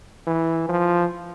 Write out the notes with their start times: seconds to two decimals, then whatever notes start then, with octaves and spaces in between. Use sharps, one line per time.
0.27 E3
0.69 F3